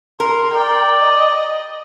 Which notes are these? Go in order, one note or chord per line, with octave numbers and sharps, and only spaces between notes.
A#4 C6
D5 G5
D#5